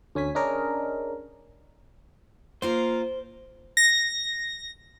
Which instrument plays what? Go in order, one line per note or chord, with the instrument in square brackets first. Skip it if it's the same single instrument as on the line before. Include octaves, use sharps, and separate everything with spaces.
[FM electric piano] D2 C#4 G#5 B6
C#4 D4 G#4 A#4 D#5
[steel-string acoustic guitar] A#3 F4 A#4 [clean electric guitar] C5
[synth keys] A#6